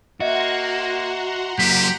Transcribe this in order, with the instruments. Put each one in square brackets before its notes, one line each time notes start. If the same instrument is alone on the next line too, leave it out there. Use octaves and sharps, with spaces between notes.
[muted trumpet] A#3 [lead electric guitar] F#4 [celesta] D#5 E5 [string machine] F#5 A#5 C6
[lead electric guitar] F#3 A#3 [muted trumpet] G4 [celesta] B6